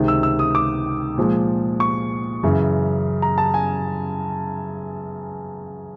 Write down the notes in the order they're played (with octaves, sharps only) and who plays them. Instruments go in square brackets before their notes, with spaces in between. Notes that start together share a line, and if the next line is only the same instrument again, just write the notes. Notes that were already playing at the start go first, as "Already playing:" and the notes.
Already playing: [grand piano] C#2 C3 D#3
E6
E6
D#6
D6
A#2 F3 G#3
C#6
F#2 C#3 E3
A#5
A5
G#5